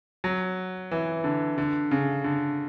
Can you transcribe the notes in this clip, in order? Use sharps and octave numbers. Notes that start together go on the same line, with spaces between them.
F#3
E3
D3
D3
C#3
D3